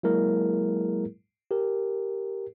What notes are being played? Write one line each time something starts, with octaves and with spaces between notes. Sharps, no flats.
F#3 G#3 A#3 E4 G#4 A#4
G4 A#4